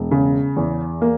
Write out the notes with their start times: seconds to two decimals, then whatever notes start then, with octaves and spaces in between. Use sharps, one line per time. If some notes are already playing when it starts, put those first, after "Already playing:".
Already playing: E1
0.11 C#3
0.56 E2
1.02 A#3